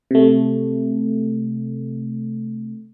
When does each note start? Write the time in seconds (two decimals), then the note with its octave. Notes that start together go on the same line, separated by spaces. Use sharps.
0.11 C3 A3